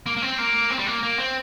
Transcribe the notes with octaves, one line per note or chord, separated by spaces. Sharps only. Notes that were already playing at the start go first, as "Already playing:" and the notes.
A#3
A#3
C4
A#3
C4
G3
A#3
A#3
C4